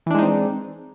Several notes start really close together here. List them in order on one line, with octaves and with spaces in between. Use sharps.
E3 D4 G#3 D#4 C4